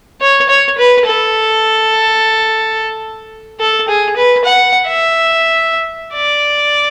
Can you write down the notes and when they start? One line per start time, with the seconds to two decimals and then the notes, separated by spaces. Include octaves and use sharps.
0.21 C#5
0.49 C#5
0.78 B4
1.06 A4
3.60 A4
3.88 G#4
4.16 B4
4.45 F#5
4.87 E5
6.14 D5